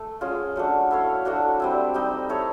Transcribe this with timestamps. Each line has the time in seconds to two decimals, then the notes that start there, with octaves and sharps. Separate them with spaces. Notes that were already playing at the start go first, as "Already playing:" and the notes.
Already playing: A3
0.21 G#3 C#4 F4
0.56 F#3 A3 D4
0.91 E4 A4 C#5 F5
1.25 F#3 A3 D4 F#4
1.60 G3 C4 E4
1.94 G3 C4 D#4
2.29 E4 A4 C#5